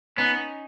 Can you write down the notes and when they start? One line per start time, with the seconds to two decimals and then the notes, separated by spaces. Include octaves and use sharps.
0.17 B3 C#4 D#4